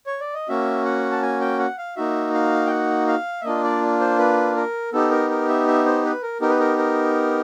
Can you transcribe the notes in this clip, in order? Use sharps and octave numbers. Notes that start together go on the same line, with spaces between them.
C#5
D5
D#5
A#3 C#4 F#4 E5
F#5
A5
G#5
G5
F#5
F5
A#3 D#4 F#4 E5
F5
G5
F#5
F5
E5
A#3 D4 F4 D#5
D5
C5
B4
A#4
B3 D#4 G4 A4
A#4
A#4
E5
E5
C5
B4
A#4
B3 D#4 G4 A#4
B4
A#4
A#4